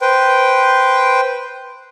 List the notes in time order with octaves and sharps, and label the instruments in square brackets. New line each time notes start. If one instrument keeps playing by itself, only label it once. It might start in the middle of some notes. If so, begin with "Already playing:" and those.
[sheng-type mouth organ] B4 C5 G5